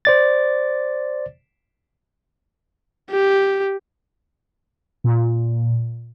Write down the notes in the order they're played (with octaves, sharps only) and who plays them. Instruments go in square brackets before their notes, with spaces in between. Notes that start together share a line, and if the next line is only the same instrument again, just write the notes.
[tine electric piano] C5 D5 A6
[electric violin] G4
[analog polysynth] A#2